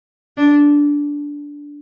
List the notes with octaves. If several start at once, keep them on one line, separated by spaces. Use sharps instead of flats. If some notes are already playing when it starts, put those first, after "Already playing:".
D4